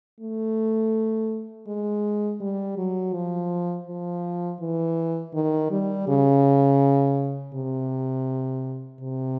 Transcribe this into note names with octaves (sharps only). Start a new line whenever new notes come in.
A3
G#3
G3
F#3
F3
F3
E3
D#3
G3
C#3
C3
C3